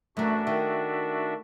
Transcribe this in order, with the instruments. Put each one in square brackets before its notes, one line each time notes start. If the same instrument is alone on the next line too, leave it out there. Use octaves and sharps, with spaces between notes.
[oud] F#2 E3 [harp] A3 [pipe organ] D4 F#4 E5
[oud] D#3 [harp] G5